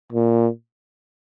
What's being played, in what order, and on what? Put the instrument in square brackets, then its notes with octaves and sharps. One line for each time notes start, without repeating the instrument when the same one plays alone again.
[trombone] A#2